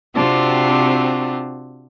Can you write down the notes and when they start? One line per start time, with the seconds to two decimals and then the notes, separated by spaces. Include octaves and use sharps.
0.15 C3 C4 D4 F4 F#4